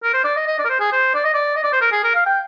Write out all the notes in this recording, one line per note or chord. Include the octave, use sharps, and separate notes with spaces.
A#4
C5
D5
D#5
D#5
D5
A#4
C5
G#4
C5
D5
D#5
D5
D#5
D5
C5
A#4
G#4
A#4
F5
G5